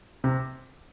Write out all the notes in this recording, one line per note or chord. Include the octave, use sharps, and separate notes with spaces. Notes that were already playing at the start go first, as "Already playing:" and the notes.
C3